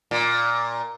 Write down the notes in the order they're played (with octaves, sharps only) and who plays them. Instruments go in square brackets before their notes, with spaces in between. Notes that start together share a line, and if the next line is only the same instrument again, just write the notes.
[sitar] A#2